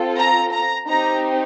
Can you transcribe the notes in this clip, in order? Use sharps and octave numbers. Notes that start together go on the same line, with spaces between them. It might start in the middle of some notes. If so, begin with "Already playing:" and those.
Already playing: C4 F4 A4
A#5
A#5
C4 D#4 G4 A#5